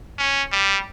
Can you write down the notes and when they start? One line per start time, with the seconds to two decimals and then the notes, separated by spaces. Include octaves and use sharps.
0.19 C#4
0.52 G3